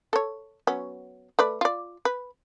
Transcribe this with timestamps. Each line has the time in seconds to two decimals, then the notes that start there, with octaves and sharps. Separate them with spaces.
0.13 A4 C#5
0.67 F#3 B3 C#4
1.39 A3 B4 D5
1.61 F4 D5
2.05 B4